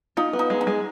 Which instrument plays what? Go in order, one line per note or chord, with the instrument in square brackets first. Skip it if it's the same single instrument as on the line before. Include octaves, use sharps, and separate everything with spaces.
[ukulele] D#4 [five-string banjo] F4
[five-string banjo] B3
[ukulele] D#4
[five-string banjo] G#3
[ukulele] D#4
[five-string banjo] G#3